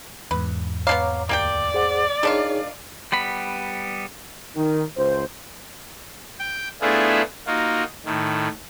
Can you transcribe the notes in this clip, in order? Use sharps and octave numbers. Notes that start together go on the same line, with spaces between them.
E2 G#2 B4
B3 D4 C#5 F5 A#5 D6
D2 A#3 G4 D5 G5
G#4 C5 F#5
D#3 D4 D#4 F4 G#4 C#5
G3 B3 B5
D#3
C#2 C5
G5
A3 B3 D4 E4 F4 G#4
A#3 D#4 F4 F#4
A2 D#3